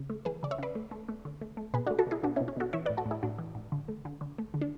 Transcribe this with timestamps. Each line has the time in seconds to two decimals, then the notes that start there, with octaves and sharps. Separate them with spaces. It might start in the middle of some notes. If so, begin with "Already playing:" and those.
Already playing: C#3
0.10 A3
0.25 E3 G#4 B4
0.43 C#3 D5
0.51 C#5 E5
0.58 C#3 B4 D5
0.75 A3
0.91 A3
1.09 A3
1.25 D3
1.41 A3
1.57 A3
1.74 B2 G#4 B4
1.87 D4 F#4
1.91 A3
1.99 F#4 A4
2.07 B2 E4 G#4
2.23 B2 D4 F#4
2.36 C#4 E4
2.41 B2
2.48 C#4
2.57 B2 F#4 A4
2.73 E3 C#5 E5
2.86 B4 D5
2.90 A2
2.97 F#4 A4
3.06 A2
3.11 E4 G#4
3.23 A2 D4 F#4
3.39 E3
3.55 A2
3.72 D3
3.88 A3
4.05 D3
4.21 D3
4.38 A3
4.54 D3
4.61 D4